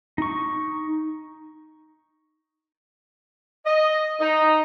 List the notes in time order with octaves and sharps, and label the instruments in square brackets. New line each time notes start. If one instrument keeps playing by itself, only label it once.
[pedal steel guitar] D#4 C#6
[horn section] D#5
D#4